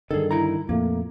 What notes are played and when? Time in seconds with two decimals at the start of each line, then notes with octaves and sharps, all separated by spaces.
0.11 G2 D3 D#3 G#4 A4
0.31 E4 A#5
0.69 F2 A#2 A3 A#3